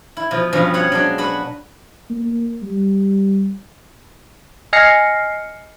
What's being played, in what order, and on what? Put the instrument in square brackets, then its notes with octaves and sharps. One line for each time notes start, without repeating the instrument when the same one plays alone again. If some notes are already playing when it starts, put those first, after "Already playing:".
[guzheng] E4
B2 F3
G2 B2 F3 C#4
F#4 C#5 F5 F#5
F#3 G#3 D4
F#4 B4 F#5
[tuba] A#3
G3
[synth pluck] D#5 G#5 F6 A#6 C7 C#7